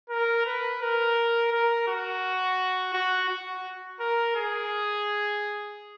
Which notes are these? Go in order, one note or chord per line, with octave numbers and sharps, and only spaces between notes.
A#4
B4
A#4
A#4
F#4
F#4
F#4
A#4
G#4